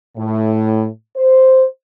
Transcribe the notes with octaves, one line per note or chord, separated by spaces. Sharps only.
A2
C5